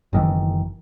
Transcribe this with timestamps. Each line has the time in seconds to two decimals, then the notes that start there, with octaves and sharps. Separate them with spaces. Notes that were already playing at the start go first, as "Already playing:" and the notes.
0.13 F#1 D#3 E3